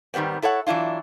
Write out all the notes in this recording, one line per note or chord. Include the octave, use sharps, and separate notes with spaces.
G#2 D#3 G3 B3 C4
E4 A4 C#5 F#5
E3 F#3 D4 E4 F4